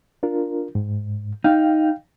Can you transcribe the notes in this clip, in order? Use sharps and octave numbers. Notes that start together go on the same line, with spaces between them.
D4 F4 A#4
G#2
D#4 F5 G5